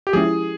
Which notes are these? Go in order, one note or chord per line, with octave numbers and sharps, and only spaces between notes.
G4
F3 G#3 C#4 E4 G#4